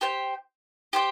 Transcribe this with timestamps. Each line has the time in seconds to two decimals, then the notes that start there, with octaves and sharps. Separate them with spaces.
0.01 G4 C5 G5
0.93 G4 C5 G5